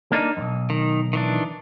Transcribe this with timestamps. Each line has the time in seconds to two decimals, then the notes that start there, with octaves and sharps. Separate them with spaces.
0.12 A#3 D4 D#4
0.37 B1 F2
0.70 D#3
1.13 D#3 E3 D4